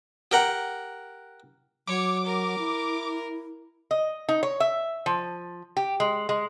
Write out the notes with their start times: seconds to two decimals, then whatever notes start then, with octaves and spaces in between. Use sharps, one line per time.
0.31 G4 A#4 F#5
1.87 F#3 C#5 D6
2.24 A#4
2.59 E4
3.91 D#5
4.29 D#4
4.43 C#5
4.60 E5
5.06 F3
5.77 G4
6.00 G#3
6.29 G#3